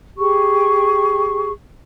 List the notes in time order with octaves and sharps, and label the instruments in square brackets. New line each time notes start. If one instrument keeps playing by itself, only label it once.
[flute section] G4 G#4 C#6